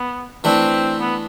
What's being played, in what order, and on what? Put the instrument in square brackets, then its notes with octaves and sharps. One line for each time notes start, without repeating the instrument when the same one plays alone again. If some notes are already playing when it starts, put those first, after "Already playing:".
Already playing: [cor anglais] B3
[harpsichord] E3 A3 D4 [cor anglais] C4
[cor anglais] B3